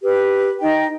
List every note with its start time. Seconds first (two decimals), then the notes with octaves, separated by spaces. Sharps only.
0.02 G4 B4
0.61 D#4 D#5 G5